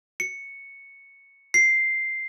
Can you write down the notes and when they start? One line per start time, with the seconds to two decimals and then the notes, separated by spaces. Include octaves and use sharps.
0.20 C#7
1.54 C7